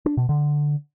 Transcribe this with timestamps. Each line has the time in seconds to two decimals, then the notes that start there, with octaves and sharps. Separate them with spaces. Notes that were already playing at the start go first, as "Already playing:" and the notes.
0.06 D4
0.17 B2
0.29 D3